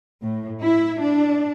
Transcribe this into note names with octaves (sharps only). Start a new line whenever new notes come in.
A2
E4
D4